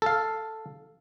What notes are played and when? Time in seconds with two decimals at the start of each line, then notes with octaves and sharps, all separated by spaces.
0.02 A4 F5